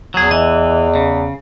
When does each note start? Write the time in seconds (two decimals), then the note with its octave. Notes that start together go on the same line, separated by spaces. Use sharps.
0.14 E2 F#3 G#4
0.31 E3 D#5
0.95 C#3